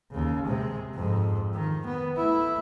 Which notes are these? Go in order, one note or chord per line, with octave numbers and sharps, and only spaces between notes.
D#2 C#3
C3 G#3
F2 G#2
D#3
B3
A3 E4